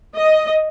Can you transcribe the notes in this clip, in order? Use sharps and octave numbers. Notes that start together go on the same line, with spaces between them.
D#5